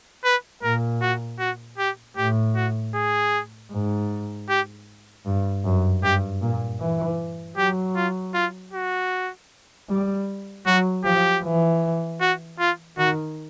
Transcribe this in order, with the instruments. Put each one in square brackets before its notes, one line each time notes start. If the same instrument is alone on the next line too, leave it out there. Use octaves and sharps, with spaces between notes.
[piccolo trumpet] B4
[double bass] A#2 [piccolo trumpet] A#4
[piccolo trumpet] F#4
F#4
G4
[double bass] A2 [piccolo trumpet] G4
[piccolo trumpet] F#4
G#4
[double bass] G#2
[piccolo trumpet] G4
[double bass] G2
F#2
[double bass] G2 [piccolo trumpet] G4
[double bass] A#2
E3
[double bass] F#3 [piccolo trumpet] G4
[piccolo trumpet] F4
F4
F#4
[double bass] G3
[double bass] F#3 [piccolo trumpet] F#4
[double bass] F3 [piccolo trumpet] G4
[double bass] E3
[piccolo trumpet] F#4
F4
[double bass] D#3 [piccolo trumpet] F#4